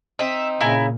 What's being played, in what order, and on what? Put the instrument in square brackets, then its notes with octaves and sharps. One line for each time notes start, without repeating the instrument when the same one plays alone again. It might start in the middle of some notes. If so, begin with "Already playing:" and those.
[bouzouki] C4 D#4 [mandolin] E5
[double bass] A#2 [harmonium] C#3 [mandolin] E4 G#5 A#5